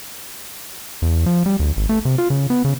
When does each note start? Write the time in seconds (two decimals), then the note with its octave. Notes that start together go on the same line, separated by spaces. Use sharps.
1.02 E2
1.26 F3
1.46 G3
1.60 D2
1.77 G#1
1.89 A3
2.05 C3
2.18 F4
2.30 C#3
2.50 B3
2.65 C#3